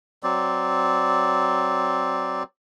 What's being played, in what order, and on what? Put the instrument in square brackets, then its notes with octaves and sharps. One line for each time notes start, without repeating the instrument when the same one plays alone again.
[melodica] F#3 C4 D5